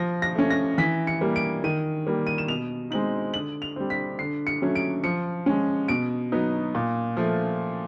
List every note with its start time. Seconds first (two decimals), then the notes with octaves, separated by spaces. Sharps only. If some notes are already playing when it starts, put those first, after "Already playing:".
Already playing: F3 A#6
0.22 A#6
0.35 A3 C#4
0.50 A#6
0.78 E3 B6
1.07 C#7
1.21 G3 A#3
1.36 D7
1.64 D#3 D#7
2.07 G3 A#3
2.27 D#7
2.38 E7
2.48 B2 F7
2.91 G#3 C4 D#4 F#7
3.34 D3 F#7
3.62 F7
3.76 G3 C4
3.90 B6
4.19 D3 C7
4.47 C#7
4.62 F#3 A3 C#4
4.75 D7
5.03 F3 C#7
5.46 G#3 C#4
5.88 B2 D7
6.32 F#3 B3 D#4
6.75 A#2
7.17 F3 A3